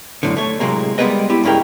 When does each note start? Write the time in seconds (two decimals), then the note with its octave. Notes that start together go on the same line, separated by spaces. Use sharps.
0.23 F#2 A2 D3
0.37 A3 C#5
0.60 A2 C3 F#3 G#3 A#3
0.98 G3 G#3 A#3 B3 B4 D#5
1.29 B3 E4 G4
1.44 C#2 G2 C#3 E4 A#4 G5